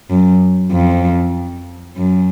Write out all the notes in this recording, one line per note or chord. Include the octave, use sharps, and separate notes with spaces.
F#2
F2
F#2